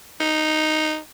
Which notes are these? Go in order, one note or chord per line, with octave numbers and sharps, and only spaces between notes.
D#4